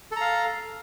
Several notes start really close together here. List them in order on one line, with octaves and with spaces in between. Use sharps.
A4 A#5 F5